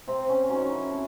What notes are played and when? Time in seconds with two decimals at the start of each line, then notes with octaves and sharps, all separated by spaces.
0.07 C3 C4
0.29 C#4
0.49 D#3 F#3 C#4
0.71 E4
0.91 C3 A4